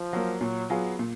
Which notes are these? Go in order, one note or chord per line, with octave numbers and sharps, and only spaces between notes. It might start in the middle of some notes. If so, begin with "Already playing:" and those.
Already playing: F3
F#3 A#3
A#2 F#3
F#3 B3 F4 G#4
A#2